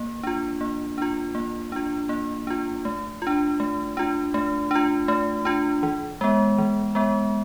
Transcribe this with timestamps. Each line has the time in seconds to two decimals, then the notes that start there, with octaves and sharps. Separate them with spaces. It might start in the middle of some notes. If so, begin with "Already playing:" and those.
Already playing: A#3
0.23 D4 F4
0.61 A#3
0.98 D4 F4
1.35 A#3
1.72 D4 F4
2.09 A#3
2.47 D4 F4
2.85 A3
3.22 D4 F4
3.60 A3
3.97 D4 F4
4.34 A3
4.71 D4 F4
5.08 A3
5.45 D4 F4
5.83 E3
6.21 G#3 B3
6.58 E3
6.95 G#3 B3